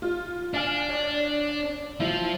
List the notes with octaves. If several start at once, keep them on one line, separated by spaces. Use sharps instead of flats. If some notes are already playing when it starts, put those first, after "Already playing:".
F4
D4 F5 G#5 F6
C#5 D5
F3 F#3 E4